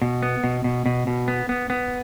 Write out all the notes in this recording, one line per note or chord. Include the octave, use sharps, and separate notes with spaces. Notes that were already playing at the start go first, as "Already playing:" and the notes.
B2
B3
B2
B2
B2
B2
B3
B3
B3